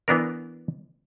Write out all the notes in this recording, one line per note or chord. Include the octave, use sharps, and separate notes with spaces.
E3 B3 D4 A#4